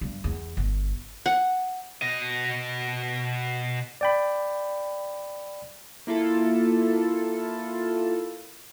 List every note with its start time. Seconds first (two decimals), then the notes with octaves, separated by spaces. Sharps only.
0.01 G2
0.24 E2
0.57 G1
1.26 F#5
2.02 B2 D#5
4.01 D5 G5 B5
6.07 A#3 E4 F4 A4